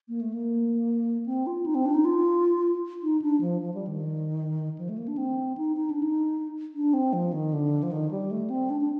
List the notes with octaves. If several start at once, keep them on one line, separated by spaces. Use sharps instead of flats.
A#3
A3
A#3
C4
F4
D#4
C4
D4
D#4
F4
D#4
D4
F3
F3
G3
D#3
F3
A3
A#3
D4
C4
D#4
D#4
D4
D#4
D4
C4
F3
D#3
D3
F3
D#3
G3
A3
C4
D4
D4